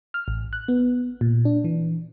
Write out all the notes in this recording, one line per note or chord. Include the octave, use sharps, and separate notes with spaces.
F6
A1
F#6
B3
A#2
D4
E3